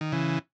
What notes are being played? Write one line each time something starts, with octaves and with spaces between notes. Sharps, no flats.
D#3
C#3 E3